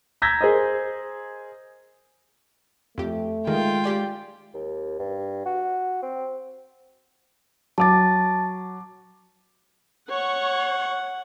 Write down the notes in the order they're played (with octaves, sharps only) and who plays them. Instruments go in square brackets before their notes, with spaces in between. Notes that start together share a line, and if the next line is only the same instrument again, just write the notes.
[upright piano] A#5 E6 G6 G#6 A#6 B6
G#4 A#4 C5 D#5
[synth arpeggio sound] F2 G4 [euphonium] A3
[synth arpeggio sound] D#3 [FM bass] G#3 [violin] F4 G5
[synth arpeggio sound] G4 D5 G#5
[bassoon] D#2
G2
F#4
C4
[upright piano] F#3 D6 [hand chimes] A5 A6
[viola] C#5 C#6 [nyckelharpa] F#5